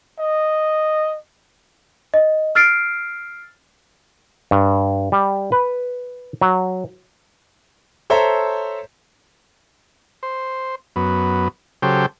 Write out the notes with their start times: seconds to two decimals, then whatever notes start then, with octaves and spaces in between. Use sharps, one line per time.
0.20 D#5
2.14 D#5
2.55 E6 F6 A6 C7 D7
4.51 G2
5.12 G3
5.52 B4
6.41 F#3
8.10 A4 C5 C#5 E5 A5 A#5
10.23 C5
10.96 F#2 B3
11.82 C#3 F#3 G4 A4 C5 G5